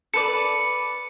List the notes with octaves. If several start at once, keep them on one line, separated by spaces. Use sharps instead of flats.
A4 B4 D5 C#7